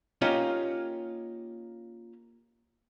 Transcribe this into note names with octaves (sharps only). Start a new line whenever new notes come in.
A#3 C#4 D#4 F4 G4